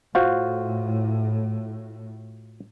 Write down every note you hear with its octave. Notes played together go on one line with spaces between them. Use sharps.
A2 F4 F#4 C5